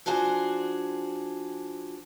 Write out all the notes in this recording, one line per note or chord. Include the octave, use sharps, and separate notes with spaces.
F3 D4 F#4 G#4 C5